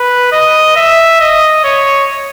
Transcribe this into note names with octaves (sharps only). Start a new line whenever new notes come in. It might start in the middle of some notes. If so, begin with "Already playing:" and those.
Already playing: B4
D#5
E5
D#5
C#5